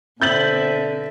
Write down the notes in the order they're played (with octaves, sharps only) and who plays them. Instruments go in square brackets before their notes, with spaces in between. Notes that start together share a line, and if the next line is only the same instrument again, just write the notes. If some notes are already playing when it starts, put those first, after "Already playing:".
[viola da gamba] B2 D3 [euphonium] C4 [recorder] E5 [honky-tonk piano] G6 A6 F#7